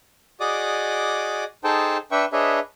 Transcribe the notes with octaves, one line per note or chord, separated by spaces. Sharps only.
F#4 G#4 D5 D#5 D6 D#6
D#4 G#4 A4 C5 G5 A5
D4 B4 E5 G5 C#6
D4 G#4 B4 C#5 D#5 E5